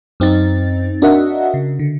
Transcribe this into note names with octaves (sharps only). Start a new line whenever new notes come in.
F#2 C4 D#4 A6
D4 F#4 A#4 D#5 E5 F#5
C#3
D3